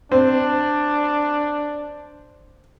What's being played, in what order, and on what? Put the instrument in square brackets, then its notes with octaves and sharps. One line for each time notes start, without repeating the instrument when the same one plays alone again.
[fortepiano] C4 [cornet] D4